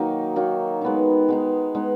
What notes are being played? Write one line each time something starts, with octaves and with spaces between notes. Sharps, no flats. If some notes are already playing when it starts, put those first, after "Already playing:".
Already playing: D#3 F#3 A#3 D#4
D#3 F#3 A#3 D#4
G#3 B3 D#4
G#3 B3 D#4
G#3 B3 D#4